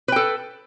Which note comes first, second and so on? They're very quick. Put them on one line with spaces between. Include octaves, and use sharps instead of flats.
B4 G5 A4